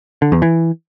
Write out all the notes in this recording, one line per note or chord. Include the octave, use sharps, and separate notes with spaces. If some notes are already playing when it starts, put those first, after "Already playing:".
D3
E2
E3